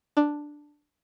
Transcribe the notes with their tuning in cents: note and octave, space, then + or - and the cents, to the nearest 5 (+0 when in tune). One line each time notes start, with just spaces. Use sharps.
D4 +5